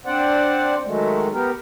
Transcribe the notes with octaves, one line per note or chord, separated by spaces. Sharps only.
C4 D4 C5 D5 F#5
D#3 F#3 G#3 A3
B3 G4 A#4